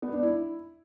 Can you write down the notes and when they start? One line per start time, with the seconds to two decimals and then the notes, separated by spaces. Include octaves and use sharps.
0.02 B3
0.13 D4
0.23 E4